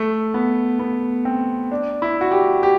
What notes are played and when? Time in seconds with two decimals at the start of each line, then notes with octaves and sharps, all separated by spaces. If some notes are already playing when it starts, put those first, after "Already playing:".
Already playing: A3
0.34 B3
0.79 B3
1.25 C4
1.71 D4
2.02 E4
2.21 F#4
2.31 G4
2.63 G4